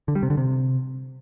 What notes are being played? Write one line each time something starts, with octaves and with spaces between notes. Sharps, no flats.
D3
G3
C3
D3
C3